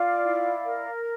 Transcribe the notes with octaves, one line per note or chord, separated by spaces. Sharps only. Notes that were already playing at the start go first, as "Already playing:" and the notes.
Already playing: F4 D5 F5
E4
A#4